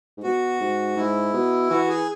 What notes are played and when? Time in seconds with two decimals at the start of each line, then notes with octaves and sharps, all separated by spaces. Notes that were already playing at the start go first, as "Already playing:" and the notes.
0.17 G#2
0.24 B2 F#4
0.60 G#2
0.97 G#2 E4
1.33 B2
1.70 E3 F#4
1.88 G#4